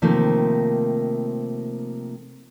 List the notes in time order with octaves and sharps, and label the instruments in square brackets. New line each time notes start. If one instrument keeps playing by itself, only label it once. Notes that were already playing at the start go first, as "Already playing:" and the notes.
[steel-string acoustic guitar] C3 D#3 F3 A3 A#3